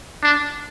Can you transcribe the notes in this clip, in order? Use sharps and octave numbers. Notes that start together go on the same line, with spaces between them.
D4